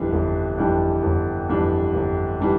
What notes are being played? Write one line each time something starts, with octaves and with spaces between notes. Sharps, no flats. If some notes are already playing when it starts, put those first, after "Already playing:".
Already playing: G1 F2 E3 G3 D4
G1
F2 E3 G3 D4
G1
F2 E3 G3 D4
G1
E3 G3 D4